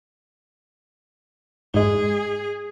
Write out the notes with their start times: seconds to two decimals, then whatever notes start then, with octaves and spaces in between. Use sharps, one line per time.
1.74 G#2 G#3 G#4